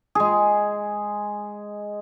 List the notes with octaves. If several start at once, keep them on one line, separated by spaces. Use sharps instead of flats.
G#3 G#4